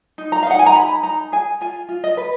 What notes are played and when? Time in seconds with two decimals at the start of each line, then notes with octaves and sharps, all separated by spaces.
0.18 D#4
0.32 A#5
0.43 F5
0.47 D#4 F#5
0.59 G#5
0.66 A#5
0.75 G#4 B5
1.03 D#4 A#5
1.32 G#4 G#5
1.61 F4 G#5
1.89 F4
2.04 D#5
2.17 B4